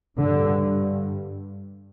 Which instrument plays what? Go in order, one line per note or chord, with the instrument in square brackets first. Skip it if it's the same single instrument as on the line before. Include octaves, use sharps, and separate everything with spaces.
[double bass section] G2 D3